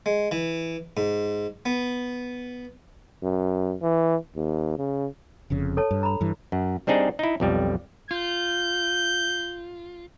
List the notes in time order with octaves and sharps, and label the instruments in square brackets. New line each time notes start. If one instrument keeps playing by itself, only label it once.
[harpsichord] G#3
E3
G#2
B3
[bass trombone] F#2
E3
D#2
C#3
[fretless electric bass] F1 F2 C#3
[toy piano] A4 C#5 A5
[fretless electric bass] G2
[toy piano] A#5 B5
[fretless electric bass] G2 E3
[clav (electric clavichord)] F#2
G3 C4 D4 D#4 G#4
D#4 E4
B1 F2 G3
[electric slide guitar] F4 [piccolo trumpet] G6